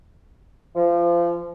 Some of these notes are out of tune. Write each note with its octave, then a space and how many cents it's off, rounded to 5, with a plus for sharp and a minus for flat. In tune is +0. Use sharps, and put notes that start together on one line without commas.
F3 -25